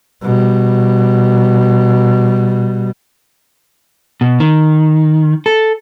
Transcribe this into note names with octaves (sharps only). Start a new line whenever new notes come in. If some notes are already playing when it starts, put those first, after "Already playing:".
B2 G3
B2
D#3
A4